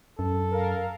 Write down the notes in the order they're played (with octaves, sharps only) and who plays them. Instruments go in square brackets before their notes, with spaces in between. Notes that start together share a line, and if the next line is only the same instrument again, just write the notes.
[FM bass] F#2 [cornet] A4
[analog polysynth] A#4 F5